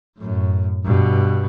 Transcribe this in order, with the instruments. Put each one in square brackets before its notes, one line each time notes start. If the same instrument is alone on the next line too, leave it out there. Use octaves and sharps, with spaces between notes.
[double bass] F#2 A2
G2 B2